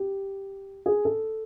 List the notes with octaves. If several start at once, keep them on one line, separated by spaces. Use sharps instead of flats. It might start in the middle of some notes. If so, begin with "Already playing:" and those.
Already playing: G4
G#4
A4